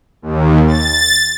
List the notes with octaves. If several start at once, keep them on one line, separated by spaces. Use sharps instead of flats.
D#2
A6